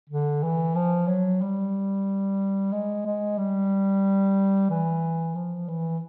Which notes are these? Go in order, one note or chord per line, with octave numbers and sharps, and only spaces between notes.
D3
E3
F3
F#3
G3
G#3
G#3
G3
E3
F3
E3